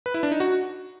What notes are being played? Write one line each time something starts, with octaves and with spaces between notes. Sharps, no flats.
B4
E4
D4
D#4
F#4